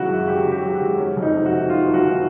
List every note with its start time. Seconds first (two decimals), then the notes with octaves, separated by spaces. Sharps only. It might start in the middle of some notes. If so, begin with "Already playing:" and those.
Already playing: G#1 C#3 F#3 E4 F#4
0.09 F#2
0.27 C#3 G4
0.45 C#3
0.51 G4
0.62 F#3
0.69 G4
0.75 F#4
0.81 G#1
0.98 F#1 C#4
1.17 F2
1.22 D#4
1.35 C3
1.46 F#4
1.51 D#3
1.70 D#3 F4
1.87 F#1
1.94 F#4
2.06 D#3